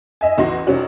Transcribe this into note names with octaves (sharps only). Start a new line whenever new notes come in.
D#5 E5 G#5
A1 E2 E4 F#4 C6 A#6
F1 F3 C#4 F#4 D5